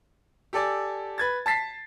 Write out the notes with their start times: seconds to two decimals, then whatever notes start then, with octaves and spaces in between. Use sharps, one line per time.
0.53 G4 A4 D5 G#5
1.18 B4 G#6 A6
1.46 A5 A6 B6 C7